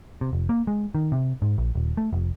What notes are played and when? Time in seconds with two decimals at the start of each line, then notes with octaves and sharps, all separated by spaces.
0.21 C3
0.33 F1
0.49 A#3
0.67 G#3
0.95 D#3
1.12 C3
1.42 G#2
1.58 A#1
1.75 D#1
1.97 A3
2.13 F1